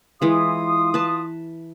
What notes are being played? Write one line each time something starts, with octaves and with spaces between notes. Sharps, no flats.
E3 G#3 F4 C6 D#6
B4 A5